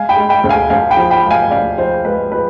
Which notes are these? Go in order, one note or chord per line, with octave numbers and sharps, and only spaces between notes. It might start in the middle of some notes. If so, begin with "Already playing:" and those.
Already playing: G#3 F5 G#5
G5 B5
G#3
G5 B5
D2
F5 G#5
D2 F5 G#5
G5 B5
F3
G5 B5
G#3
F5 G#5
D2 D5 F5
F3 C5
G#3 B4
F3 B4